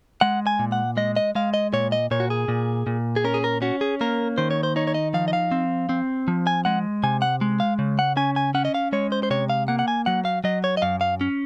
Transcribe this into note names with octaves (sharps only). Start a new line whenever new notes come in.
G#3 F#5
G#5
A#2
F#5
G#3 D#5
D#5
G#3 F5
D#5
A#2 C#5
D#5
A#2 C#5
F#4
G#4
A#2
A#2
G#4
C#4 A#4
G#4
A#4
C#4 F#4
G#4
A#3 A#4
D#3 C5
C#5
C5
D#4 C#5
C#5
D#5
F3 F5
D#5
F5
C4
C4
F3
G#5
G#3 F#5
C3 G#5
F#5
G#3
F5
C#3
F#5
C#4 G#5
G#5
C#4 F#5
D#5
F5
G#3 C#5
C5
C5
C3 C#5
F5
A#3 F#5
F#5
G#5
F#3 F#5
F5
F#3 D#5
C#5
D#5
F#2 F5
F5
C#4